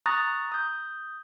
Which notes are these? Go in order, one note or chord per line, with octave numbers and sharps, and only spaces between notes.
A#5 C#6 D#6 F#6 A6 A#6
D#6 G6